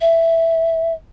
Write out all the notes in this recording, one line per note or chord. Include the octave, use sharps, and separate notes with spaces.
E5